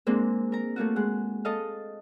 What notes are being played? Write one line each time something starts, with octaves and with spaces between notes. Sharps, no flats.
G#3 A#3 C4 D4
A#4 A#5
A3 A#3 F4 F#4
G#3 F#5
A4 D#5 F5